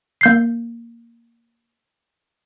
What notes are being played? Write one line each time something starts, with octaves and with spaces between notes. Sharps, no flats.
A#3 G6 C7